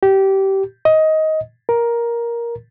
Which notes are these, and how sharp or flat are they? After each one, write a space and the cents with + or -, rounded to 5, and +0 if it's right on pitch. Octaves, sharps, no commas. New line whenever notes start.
G4 -20
D#5 +15
A#4 +10